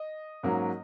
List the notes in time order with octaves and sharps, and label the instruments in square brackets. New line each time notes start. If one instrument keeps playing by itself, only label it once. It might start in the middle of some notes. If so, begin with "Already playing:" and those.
Already playing: [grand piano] D#5
G#2 F#3 A#3 C#4